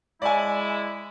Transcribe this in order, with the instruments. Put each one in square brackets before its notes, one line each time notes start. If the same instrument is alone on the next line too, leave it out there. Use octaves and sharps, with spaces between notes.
[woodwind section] G#3 E4 [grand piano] D5 G#5